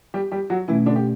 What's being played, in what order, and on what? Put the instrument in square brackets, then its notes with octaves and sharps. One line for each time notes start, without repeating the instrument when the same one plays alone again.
[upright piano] G3 G4
G3 G4
F#3 F#4
[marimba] B2 A3 C#4 [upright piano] E3 E4
[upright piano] D3 D4
G4